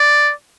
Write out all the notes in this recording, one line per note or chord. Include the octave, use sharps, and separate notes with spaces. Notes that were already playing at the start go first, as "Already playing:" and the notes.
Already playing: D5